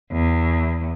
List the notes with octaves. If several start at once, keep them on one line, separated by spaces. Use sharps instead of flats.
E2